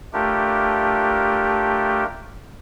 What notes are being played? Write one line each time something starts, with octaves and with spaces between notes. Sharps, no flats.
A3 D4 F4 G4 A#4